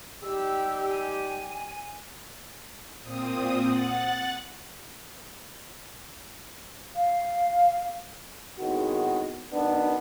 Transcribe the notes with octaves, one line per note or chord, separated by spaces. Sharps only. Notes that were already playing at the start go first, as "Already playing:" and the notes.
G3 D#4 G4 E6
G#5
A#2 C4 D#6
F#5 F#6 A6
F5
G#1 A2 D#3 G#3 B3 F#4
F#2 D#3 B3 D4